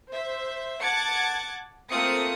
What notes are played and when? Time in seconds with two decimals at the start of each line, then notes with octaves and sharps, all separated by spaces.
0.11 C5 E5
0.82 F#5 A5 D6 G#6 A6 C#7
1.90 A3 A#3 C4 F4 D#6 C#7